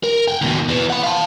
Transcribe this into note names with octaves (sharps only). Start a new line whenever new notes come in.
A#4
F#5 G5
D#2 B2
E2 E3
F#5 B5
F5 A5